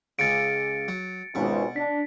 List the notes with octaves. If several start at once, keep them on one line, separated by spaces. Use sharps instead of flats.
C#2 C#3 A6 C#7 D7
F#3
G#1 C#2 B2
D4 B6